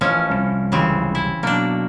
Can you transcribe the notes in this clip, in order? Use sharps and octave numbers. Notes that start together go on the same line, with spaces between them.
A1 F3 C#4
C2
F1 C#2 C#3 E3 G3 C4
E4
B2 F#3 A#3 D4